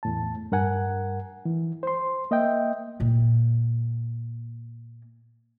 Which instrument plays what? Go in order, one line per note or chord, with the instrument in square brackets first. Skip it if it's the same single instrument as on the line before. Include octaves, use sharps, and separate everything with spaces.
[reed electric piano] E2 A2 A5
G2 A#4 F#5 G#5
E3
C5 C6
A#3 D#5 E5 G5
[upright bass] A#2 A#3